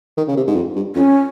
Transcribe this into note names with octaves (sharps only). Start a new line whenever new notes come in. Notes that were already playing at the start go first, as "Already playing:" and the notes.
D#3
C#3
C3
G#2
F2
G2
F2 C#4